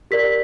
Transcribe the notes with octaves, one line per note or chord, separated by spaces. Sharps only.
G4 A#4 D5 B6